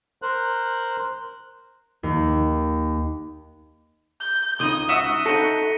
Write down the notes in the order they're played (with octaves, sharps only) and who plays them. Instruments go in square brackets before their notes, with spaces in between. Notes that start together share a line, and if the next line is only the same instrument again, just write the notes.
[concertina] A#4 C5 F#6
[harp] D#2
[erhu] G6
[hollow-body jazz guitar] C#2 D#4 [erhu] D#6 [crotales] D#7 F#7 G7
[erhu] F#4 [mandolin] E5 F#5 D#6 [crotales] B6
[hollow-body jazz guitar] D#4 A4 [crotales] A#6 C#7 D#7